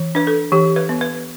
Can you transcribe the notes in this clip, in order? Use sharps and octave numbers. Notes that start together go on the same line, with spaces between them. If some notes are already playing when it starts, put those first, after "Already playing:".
Already playing: E3
D4 B4
A4
E3 G4
B4
B3
B4